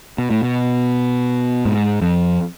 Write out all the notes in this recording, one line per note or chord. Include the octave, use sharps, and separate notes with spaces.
B2
A2
B2
G#2
F2